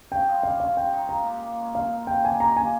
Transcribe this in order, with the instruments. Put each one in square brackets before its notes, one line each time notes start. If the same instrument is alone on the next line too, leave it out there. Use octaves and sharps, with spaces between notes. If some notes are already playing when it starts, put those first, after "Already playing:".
[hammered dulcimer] C#3 [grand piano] G5
[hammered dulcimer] F3 G#3 C4
[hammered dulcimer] G3 [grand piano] F5
[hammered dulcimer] C#4 F4 [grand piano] F5
[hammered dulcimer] C#3 [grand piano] G5
[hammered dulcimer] G#3 D#4
[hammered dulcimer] A#2 [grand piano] A#5
[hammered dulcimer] G#3 D#4 G4
A#2
G#3 C#4
[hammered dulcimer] A#2 [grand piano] F5
[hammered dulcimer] F3 C4 F4
[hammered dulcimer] A#2 [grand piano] G5
[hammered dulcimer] G3 C#4 G4 [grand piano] G#5
[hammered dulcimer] D#3 [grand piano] A#5
[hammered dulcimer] A#3 F4 [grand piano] G#5